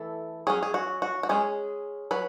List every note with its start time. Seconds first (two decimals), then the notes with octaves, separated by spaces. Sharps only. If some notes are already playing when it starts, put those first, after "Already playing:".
Already playing: E3 A3 A4
0.47 F#3 C#4 G#4
0.63 G#4
0.74 F#4
1.02 F#4
1.23 F#4
1.29 G#3 C#4 G#4
2.11 F#3 B4